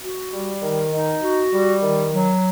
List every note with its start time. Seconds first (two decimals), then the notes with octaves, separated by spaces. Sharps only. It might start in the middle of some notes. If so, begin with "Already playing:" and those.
0.02 F#4
0.32 G3
0.62 D#3
0.92 D#4
1.22 F#4
1.53 G3
1.82 D#3
2.12 F#3